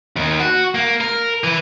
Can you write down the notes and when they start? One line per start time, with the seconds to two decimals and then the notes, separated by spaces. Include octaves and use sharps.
0.16 D#2
0.39 F#4
0.75 A#3
1.01 A#4
1.44 E3